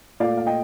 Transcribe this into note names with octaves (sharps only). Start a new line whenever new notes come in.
A#2 A3 D5 F5
F5
D#5 G5